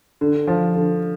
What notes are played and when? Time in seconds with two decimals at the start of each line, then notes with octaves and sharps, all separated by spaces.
0.21 D3
0.47 F3
0.75 D3